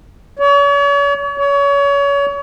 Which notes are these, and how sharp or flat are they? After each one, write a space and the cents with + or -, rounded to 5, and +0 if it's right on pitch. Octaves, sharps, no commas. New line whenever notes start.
C#5 +40
C#5 +30